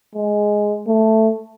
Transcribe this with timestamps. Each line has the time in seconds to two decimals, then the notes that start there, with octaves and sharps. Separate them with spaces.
0.15 G#3
0.87 A3